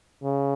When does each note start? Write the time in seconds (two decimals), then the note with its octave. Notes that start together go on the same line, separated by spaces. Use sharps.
0.23 C#3